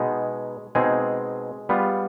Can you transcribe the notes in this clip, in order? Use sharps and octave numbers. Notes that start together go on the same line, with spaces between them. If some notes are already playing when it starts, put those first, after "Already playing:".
Already playing: B2 G#3 B3 D#4 G#4
B2 G#3 C4 D#4 G#4
G3 B3 F4